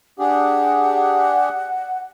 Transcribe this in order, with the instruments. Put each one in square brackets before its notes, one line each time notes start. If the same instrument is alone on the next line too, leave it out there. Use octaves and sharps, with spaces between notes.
[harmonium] D4 G4 G#4 [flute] F#5